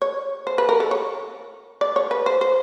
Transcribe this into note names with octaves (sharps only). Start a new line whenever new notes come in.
C#5
C5
B4
A#4
A4
C#5
D5
C#5
B4
C5
C5